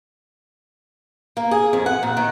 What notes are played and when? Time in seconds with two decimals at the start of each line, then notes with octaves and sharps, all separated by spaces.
1.37 A#3
1.51 G#4
1.73 F2
1.86 F#5
2.03 A#2
2.17 D#3